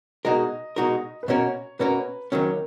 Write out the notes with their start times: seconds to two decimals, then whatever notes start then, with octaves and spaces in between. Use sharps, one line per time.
0.25 B2 G#3 D#4 F#4 A#4 D#5
0.76 B2 G#3 D#4 F#4 A#4
1.23 B4
1.28 B2 A#3 C#4 F#4 A#4 C#5
1.79 B2 A#3 C#4 F#4 A#4 B4
2.32 D#2 D#3 F#3 C#4 A#4